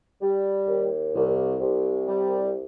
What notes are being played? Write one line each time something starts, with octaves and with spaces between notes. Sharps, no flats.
G3
D#2
C2
C2
G3